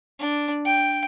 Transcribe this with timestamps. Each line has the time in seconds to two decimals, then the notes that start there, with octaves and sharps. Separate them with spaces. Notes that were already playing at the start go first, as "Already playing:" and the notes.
0.20 D4
0.66 G5